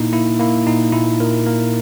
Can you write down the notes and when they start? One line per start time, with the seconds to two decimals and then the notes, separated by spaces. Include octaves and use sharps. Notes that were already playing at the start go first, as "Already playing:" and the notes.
Already playing: A#2 A#3 D#4 E4
0.12 A#3 E4
0.40 A#3 E4
0.66 A#2 D#4
0.93 A#2 E4
1.20 A#2 A#4
1.46 A#3 A#4